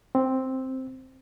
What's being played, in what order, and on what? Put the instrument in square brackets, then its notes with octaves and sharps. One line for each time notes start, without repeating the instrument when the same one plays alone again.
[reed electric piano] C4